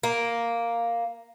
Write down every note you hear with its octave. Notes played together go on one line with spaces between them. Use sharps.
A#3